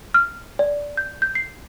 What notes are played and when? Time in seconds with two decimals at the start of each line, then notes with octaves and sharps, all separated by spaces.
0.14 F6
0.59 D5
0.97 G6
1.22 G6
1.35 C7